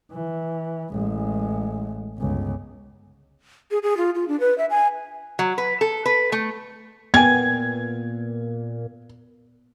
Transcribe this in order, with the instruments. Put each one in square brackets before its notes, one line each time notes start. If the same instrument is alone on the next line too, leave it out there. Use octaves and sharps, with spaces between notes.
[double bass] E3
A1 G#3
G1 C#2
[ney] G#4
G#4
F4
F4
D4
B4
E5
G#5
[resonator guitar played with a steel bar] F#3
B4
A4
B4
A3
[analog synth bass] A#2 [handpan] B3 [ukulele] G5 G#5 [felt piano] G#6